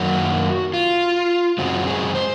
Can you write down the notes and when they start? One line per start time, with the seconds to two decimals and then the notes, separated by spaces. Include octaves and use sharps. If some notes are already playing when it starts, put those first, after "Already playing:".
Already playing: F#2 D#3 F#3 A#3 F#4
0.74 F4
1.58 F#2 C#3 G#3 C4 F#4
1.87 G#4
2.15 C5